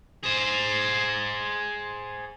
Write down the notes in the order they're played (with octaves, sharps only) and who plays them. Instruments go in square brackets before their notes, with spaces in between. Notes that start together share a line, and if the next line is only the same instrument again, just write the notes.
[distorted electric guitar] G#4 C5